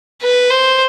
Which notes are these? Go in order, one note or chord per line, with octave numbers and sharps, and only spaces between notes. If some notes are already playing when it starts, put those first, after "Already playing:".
B4
C5